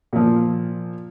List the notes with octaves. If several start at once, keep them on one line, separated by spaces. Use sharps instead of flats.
A#2 F3